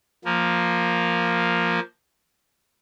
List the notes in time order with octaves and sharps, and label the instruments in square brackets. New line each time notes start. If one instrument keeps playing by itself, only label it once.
[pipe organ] F3 A#3